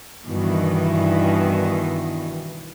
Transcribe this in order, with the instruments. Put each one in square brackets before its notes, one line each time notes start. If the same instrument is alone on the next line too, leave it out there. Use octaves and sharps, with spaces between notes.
[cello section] G2 B2 D#3 E3